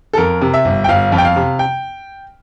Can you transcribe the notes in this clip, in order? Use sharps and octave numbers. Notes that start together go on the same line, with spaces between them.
A4
F2 A#4
C3
E5
G1
G5
G1 F5
F2
G5
F5
C3
G5